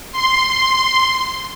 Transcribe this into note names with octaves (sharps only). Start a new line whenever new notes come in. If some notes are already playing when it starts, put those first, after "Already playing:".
C6